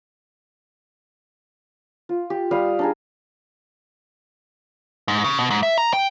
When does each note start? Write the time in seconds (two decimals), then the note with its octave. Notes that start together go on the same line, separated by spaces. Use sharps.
2.09 F4
2.30 G4
2.51 G3 F5 D#6
2.79 D4 D#4 G#4
5.08 G#2
5.24 C#3
5.39 B2
5.50 G#2
5.63 E5
5.78 A#5
5.93 G5